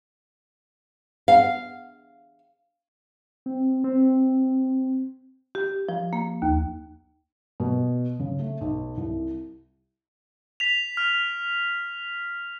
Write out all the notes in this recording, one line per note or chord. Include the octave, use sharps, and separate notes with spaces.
F5
C4
C4
G4
F3
A#3
D#2
B2
C#3
A3
B1
C2
B6 F7
F6